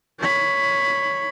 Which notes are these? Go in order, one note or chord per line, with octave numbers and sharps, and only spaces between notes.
C#5 B5